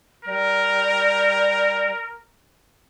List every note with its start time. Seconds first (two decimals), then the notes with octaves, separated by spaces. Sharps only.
0.25 G3 A#4